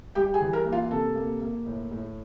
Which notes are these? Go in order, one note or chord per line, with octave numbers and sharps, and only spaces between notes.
G3 G4 G5
G#4 G#5
E3
A#4 A#5
A#3
F4 F5
C3 A4 A5
A#3
A#3
A2
A2